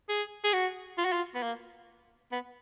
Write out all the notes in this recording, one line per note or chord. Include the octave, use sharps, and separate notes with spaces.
G#4
G#4
F#4
F4
F#4
F4
B3
A#3
B3